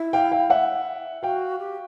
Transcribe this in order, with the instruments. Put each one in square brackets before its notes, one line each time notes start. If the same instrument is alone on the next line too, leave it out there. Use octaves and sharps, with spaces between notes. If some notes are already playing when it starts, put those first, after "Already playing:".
Already playing: [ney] E4
[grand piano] F5 G5
F5 G5
E5 F#5
[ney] F#4 [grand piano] F5 G5
[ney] G4